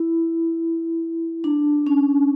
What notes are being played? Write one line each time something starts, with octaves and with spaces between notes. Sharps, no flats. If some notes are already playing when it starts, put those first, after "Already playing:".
Already playing: E4
D4
C#4